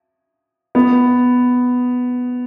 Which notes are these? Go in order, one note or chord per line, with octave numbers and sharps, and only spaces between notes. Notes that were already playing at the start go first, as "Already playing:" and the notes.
B3